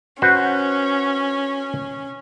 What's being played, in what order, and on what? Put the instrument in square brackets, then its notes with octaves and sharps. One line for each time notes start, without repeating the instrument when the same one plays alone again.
[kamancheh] C#4 [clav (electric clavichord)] F#4 B4 C5